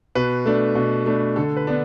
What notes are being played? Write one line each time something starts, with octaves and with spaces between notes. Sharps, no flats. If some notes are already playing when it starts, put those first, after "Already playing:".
B2 B4
A3 D4
B2
A3 D4
D3 A4
B4
B3 D4